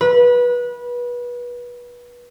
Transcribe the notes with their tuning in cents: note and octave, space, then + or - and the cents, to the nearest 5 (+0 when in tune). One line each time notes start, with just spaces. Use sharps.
B4 -25